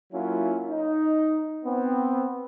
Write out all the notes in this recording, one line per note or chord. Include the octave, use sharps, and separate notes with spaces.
F#3 A#3 C#4 E4 F4
D#4
B3 C4